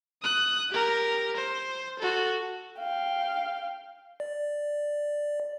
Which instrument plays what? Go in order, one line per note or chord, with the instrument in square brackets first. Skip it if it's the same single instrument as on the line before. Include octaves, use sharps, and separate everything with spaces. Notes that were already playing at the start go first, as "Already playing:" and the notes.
[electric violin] D#6 F#6
G4 A#4
C5
F#4 A4
[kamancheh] F5 G5
[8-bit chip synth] D5